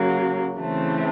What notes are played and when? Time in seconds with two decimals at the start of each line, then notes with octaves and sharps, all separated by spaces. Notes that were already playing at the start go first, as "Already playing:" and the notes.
Already playing: C#3 F#3 A#3
0.57 C#3 E3 A3 C4